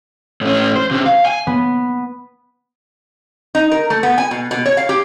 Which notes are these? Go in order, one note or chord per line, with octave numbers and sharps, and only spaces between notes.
A2 C#4
C5
C3 C#4
F5
G#5
B3
D#4
A#4
A3
B3
G#5
B2
B2
C#5
F5
G4